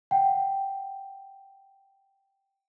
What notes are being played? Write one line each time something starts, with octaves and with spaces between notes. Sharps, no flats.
F#5 G5